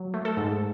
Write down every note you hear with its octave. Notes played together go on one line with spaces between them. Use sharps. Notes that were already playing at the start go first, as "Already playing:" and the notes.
Already playing: F#3
A3
A4
G#2